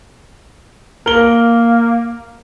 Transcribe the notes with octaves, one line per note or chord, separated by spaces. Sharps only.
A#3 A#4 G7